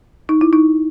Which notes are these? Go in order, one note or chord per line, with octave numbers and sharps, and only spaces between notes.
D#4
E4
D#4